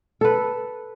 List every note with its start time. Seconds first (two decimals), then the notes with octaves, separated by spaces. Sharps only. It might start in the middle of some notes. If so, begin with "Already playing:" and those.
0.21 A4 B4